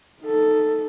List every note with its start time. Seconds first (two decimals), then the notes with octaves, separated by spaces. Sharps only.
0.23 D#4 A4